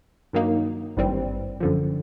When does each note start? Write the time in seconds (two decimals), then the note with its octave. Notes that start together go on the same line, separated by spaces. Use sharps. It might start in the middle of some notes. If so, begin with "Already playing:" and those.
0.33 G2 D#3 F#3 A#3 D#4
0.97 G#1 G2 E3 G3 C4
1.60 F#2 D3 F3